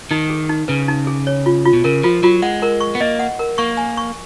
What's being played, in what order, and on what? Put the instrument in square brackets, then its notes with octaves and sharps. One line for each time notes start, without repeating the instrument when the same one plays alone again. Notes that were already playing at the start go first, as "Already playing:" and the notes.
[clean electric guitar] D#3 [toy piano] D#4
[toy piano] G#4
D#4
[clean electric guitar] C#3 [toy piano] B4
[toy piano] D#4
G#4
C#5
F4
F4
[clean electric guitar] B2
[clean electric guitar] C#3 [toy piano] A#4
[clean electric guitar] F3 [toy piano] F4
[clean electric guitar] F#3 [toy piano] F4
[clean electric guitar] G#3 [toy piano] F#5
[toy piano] A#4
C#6
[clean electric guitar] B3
[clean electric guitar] A#3 [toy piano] D#5
[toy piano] F#5
A#4
[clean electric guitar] A#3 [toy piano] C#6
[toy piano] G#5
C#6